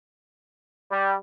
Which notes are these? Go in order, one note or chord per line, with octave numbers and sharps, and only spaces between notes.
G3